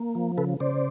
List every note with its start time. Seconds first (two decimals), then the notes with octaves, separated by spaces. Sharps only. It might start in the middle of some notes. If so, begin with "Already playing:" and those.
Already playing: A#3
0.15 F3
0.37 C#3 A4 B4
0.60 C#3 C5 D5